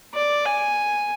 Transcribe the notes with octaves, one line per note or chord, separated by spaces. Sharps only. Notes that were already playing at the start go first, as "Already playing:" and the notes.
D5
G#5